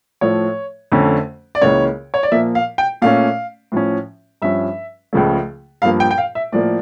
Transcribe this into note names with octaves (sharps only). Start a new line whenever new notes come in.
A2 F3 A3 C#5
F2 D3 A3 C#4
D5
C#2 C#3 E3 A#3 C#4 C#5
C#5
D5
A#2 F3 A#3 E5
F5
G5
A#2 A3 C#4 F5
A2 F3 C#4
G2 F3 C#4 E5
C#2 C#3 F3 A3
G2 F3 A#3 F5
G5
G5
F5
E5
A2 F3 A#3 D5